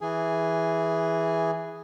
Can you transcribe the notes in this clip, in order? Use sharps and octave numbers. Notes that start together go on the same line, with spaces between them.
E3 G#4